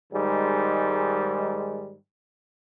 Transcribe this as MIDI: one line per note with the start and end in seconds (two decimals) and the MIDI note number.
0.13 1.94 44
0.13 1.94 51
0.13 1.94 55
0.13 1.94 56